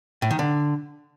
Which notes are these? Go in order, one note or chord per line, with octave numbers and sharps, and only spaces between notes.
A2
D#3
D3